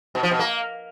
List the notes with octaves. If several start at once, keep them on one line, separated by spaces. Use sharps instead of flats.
B2
F3
B2
A#3